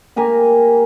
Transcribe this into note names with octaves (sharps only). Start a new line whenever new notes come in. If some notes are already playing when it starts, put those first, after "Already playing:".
A#3 G4 G#5 A#5